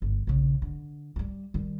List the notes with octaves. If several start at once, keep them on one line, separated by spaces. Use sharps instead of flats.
G1
A#1 C#3
D3
F#3 G3
D#3 G3